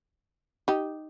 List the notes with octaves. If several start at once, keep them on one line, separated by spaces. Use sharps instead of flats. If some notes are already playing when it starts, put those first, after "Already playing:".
D#4 G4